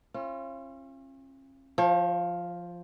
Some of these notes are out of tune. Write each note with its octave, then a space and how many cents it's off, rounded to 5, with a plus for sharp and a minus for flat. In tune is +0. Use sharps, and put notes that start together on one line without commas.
C#4 -45 F4 -35
F3 +0 C#5 -45